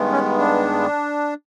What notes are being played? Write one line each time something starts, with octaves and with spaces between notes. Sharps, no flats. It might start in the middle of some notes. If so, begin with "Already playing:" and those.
Already playing: G2 D#3 G#3 B3
C#4
D4